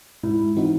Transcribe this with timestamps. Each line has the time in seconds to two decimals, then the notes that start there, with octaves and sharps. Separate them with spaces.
0.23 G#2 E4
0.56 E3 C4 D#4 F#4